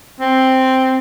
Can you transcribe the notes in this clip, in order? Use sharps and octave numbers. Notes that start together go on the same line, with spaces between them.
C4